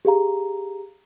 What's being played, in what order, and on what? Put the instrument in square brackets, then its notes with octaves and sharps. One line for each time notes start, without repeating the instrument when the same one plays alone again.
[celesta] G4 G#4 F5 A#5